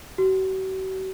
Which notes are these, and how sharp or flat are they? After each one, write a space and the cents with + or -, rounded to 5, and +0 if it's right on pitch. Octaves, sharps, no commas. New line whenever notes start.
F#4 +45